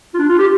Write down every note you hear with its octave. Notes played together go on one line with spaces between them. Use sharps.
F4
D4
F4
G4